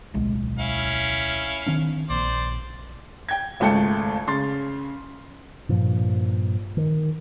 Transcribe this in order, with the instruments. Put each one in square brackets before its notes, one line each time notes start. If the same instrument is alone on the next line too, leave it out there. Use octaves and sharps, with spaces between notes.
[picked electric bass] D1 B1 G#3
[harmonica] C#4 E4 F5
[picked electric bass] D#3 C4 D4
[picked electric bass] A#1 [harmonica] C5 D5
[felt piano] G5 G#6
G#1 C#2 A3 G5 A5 C#7
C#3 C6 A6
[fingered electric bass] G2 A#2 F3
D#3